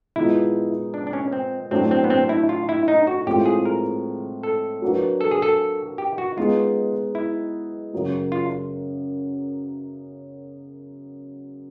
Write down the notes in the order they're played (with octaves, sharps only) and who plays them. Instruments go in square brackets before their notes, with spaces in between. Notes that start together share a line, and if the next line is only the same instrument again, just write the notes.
[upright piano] A#2 F3 G#3 B3 D#4 [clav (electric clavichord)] E4
[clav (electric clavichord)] D4
D4
C#4
C4
[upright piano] A2 F#3 A3 D4 [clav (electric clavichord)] C4
[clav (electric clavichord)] C4
B3
C4
E4
F4
E4
D#4
F#4
[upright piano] A2 F3 G#3 C4 F4 [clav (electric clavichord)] G4
[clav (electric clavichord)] G#4
A#4
A4
[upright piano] F#3 A#3 D4 F#4 B4
[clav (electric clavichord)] A4
G#4
A4
G4
F#4
[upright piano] G#3 B3 D#4 G#4 [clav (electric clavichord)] F4
[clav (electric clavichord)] E4
[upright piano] F#2 C#3 F#3 A#3
[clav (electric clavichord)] F4